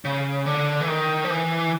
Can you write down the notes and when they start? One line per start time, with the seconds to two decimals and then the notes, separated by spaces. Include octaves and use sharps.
0.05 C#3
0.46 D3
0.81 E3
0.88 D#3
1.24 F3
1.30 E3